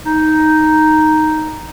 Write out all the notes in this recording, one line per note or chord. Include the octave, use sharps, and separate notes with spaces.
D#4